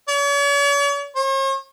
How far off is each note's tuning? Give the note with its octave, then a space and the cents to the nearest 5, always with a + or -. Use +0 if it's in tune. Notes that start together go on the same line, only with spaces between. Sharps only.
C#5 +45
C#5 -45